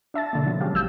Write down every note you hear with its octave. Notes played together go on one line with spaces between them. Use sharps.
D4 E5 A5 A6
B2 D3 A#3
D3 F3 F#3
F#3 G#3 C#4 G4 F5
A1 E6 G6